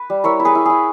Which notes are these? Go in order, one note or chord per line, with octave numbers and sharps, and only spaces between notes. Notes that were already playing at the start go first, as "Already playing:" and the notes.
Already playing: B4
G3
E4 A#4 C#5
E4
G#4 B4
E4
E4 G#4